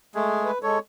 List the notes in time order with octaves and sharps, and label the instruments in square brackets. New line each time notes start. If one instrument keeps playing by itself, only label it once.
[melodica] G#3 A3 G#4
[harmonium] B4
[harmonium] G#3 A4 [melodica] C#5